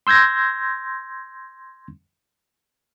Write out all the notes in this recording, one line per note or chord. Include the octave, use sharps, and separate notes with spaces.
C6 E6 G6 G#6 A#6